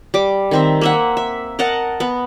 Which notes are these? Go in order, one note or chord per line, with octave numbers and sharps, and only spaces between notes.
G3 D6
D#3 C4 E5
A#3 E5 F#5
E5
A#4 D#5 F#5 A5
B3